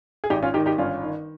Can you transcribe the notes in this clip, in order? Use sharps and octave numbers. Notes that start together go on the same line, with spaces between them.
G#4
G#1 D#4 G4
C#4 F4
D#3 D#4 G4
D#4 G4
G1 C#4 F4
D#3